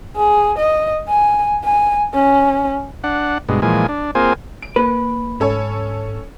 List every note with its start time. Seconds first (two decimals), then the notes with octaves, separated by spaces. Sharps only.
0.16 G#4
0.58 D#5
1.08 G#5
1.64 G#5
2.14 C#4
3.04 D4 F#5
3.49 G2 B2 G#3
3.62 A#2 E3 F3 G#3 G#5
3.89 D4
4.15 A#3 C4 F4 G#4 C5 G#5
4.62 D7
4.76 A#3 B4
5.40 G#2 C#4 A4 C#5